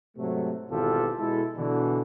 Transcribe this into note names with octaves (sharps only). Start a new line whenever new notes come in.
G#2 C3 F#3 A3
G#1 B2 E3 F4 G4 A4
B2 G#3 E4 A4
B2 D3 E3